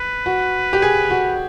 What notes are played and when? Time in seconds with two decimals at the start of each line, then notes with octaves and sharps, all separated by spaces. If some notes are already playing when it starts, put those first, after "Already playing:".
Already playing: B4
0.26 F#4
0.73 G4
0.82 G#4
1.10 F#4